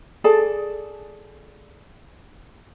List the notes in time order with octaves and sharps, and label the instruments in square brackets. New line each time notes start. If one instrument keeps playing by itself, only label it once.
[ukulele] G#4 A4 D5 A5